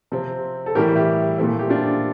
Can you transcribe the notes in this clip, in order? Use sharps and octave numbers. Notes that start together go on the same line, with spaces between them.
C3 F3 C4
A4
A2 E3 G3 G4 A#4
E4 G4
A#2 F3 A3 C4 E4
G4
D4 F4